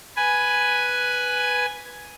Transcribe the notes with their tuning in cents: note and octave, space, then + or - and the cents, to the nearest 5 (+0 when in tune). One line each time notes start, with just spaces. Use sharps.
B4 +0 G#5 +5